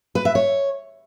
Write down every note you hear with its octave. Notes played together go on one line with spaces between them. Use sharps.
B4
E5
C#5